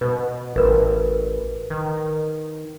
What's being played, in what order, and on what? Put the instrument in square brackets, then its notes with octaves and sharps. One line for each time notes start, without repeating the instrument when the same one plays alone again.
[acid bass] B2 [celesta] B4
[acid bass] A1 [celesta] A#4 B4
[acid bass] D#3